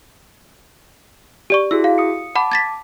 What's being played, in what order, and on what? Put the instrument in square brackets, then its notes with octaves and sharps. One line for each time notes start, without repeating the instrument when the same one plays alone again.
[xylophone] G4 D5 C#6
[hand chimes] E4 F#4 G#4 [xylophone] E6
[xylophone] F5
[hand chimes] D#6 C#7
[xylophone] F#5 B5 [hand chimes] A5 D6
[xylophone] G#6 A6 B6